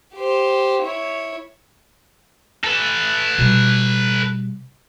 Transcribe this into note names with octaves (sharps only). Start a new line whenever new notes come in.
G4 C5
E4 C#5
A4 B4
B2 G3